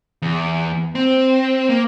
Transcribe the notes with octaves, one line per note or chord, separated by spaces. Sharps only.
E2
C4
A#3